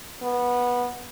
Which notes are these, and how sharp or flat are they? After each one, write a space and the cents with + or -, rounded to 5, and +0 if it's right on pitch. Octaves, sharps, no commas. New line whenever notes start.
B3 -15